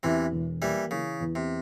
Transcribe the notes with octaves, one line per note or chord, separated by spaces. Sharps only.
E2 C3 E3
E1
E3 G3 A#3
C#3 E3
E2
C3